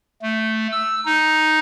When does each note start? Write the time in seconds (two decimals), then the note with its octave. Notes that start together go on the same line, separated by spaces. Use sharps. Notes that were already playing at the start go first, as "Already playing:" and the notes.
0.22 A3
0.72 E6
1.06 D#4